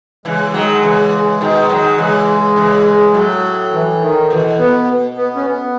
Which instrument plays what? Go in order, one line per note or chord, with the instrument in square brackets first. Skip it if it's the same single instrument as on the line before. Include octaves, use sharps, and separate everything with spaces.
[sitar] C#3 E3 [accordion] G#3
[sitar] D#3 F#3 [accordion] G#3
[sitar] C#3 E3
B2 D#3
D#3 F#3
[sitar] C#3 E3 [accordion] G#3
[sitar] C#3 E3
[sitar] A2 [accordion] F#3
[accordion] E3
D#3
[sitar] B2 [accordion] E3
[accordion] B3
B3
C#4
B3